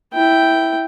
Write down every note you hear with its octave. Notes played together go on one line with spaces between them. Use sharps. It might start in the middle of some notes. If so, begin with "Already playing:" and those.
E4 G5